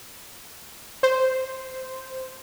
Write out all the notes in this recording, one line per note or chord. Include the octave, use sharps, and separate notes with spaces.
C5